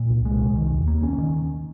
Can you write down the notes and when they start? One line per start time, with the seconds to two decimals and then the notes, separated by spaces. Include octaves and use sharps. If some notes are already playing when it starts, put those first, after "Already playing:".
Already playing: A#2
0.09 C2
0.25 G#3
0.41 C2
0.56 D#3
0.72 D#2
0.88 A#3
1.03 C#4
1.18 D#3